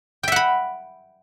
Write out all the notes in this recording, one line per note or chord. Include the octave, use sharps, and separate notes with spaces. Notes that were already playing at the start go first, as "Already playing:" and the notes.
E5 F#5 G5 B5